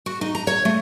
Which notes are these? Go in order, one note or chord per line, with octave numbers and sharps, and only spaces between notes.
F#4
D#4
A#5
C#5
A3